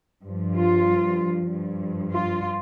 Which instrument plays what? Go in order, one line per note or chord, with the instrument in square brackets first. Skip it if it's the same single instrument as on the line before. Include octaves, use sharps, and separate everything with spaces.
[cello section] G2 F3
F4
G2 F3
F4